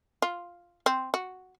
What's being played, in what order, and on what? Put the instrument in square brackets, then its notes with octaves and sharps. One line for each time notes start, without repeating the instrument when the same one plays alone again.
[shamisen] F4
C4
F#4